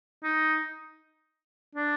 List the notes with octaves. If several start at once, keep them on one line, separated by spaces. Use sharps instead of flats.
D#4
D4